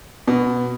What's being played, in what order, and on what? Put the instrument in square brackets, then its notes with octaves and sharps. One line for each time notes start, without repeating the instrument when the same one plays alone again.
[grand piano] B2